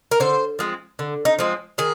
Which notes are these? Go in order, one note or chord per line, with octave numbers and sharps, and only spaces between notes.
A#4
D3 C5
F3 G#3 C4
D3
D#4
F3 G#3 C4
D#3 G#4